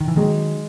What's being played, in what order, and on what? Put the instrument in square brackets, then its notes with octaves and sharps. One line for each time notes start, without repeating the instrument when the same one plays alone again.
[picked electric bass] D#3
E3
[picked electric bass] D#3 F#3 [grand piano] G#3